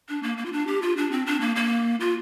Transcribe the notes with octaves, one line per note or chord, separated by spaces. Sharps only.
D4
A#3
A#3
F4
D4
G4
F4
D4
C4
D4
A#3
A#3
F4